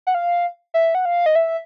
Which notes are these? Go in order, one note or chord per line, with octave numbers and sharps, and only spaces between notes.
F#5
F5
E5
F#5
F5
D#5
E5